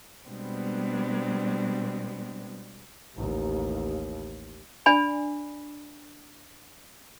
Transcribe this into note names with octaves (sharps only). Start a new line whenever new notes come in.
B2 G3 G#3 B3 C4 D4
A1 D#2
D4 D5 G#5 B5